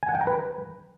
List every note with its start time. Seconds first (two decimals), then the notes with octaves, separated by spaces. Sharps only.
0.03 G#5
0.09 F#5
0.15 G5
0.21 A#5
0.27 B4